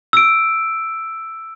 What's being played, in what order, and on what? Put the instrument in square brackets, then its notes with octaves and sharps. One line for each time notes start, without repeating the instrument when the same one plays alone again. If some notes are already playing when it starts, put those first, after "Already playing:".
[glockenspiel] E6 D7